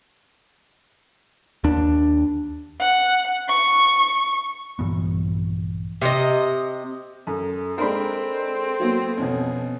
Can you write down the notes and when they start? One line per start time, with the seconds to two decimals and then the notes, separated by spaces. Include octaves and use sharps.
1.64 D#2 D4
2.80 F#5
3.48 C#6
4.79 A#1 G2 E3 B3
6.02 C3 D#5
7.27 F#2 A4
7.78 G#3 C4 D4 A4 A#4 C5 B5
8.80 F#3 A#3 B3
9.17 F2 B2 C#4